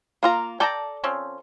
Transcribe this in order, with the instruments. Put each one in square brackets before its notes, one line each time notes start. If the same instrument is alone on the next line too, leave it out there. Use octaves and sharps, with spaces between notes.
[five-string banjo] A#3 F4 A#5
[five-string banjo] A4 D5 [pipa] G5 A5 A#5
[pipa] F3 C4 C#4